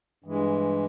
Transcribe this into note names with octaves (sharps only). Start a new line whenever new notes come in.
G2 E3 G#3